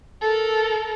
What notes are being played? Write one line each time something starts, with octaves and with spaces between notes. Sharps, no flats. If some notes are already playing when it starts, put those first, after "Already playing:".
A4 A#4